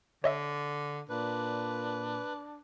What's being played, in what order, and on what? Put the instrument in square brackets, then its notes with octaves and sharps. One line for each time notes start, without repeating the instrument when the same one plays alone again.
[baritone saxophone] D3 [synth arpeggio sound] C#5 D#5 E5
[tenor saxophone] A#2 [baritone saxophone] D4 [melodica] B4